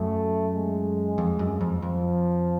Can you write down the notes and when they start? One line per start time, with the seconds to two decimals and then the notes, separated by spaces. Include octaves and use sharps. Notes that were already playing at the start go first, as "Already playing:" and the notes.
Already playing: F#2 A3
0.54 G#3
1.18 F2
1.39 F#2
1.61 F2
1.82 F2 F3